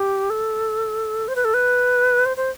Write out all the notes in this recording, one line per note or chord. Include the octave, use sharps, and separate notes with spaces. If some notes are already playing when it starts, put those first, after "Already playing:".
Already playing: G4
A4
C5
B4
A4
B4
C5
C5